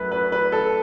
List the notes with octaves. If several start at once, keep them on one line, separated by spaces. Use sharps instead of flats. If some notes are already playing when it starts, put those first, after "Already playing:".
Already playing: F#2 F#3 A3 B4
B4
B4
A4